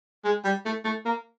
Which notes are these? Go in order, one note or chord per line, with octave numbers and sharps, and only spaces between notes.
G#3
G3
A3
A3
A#3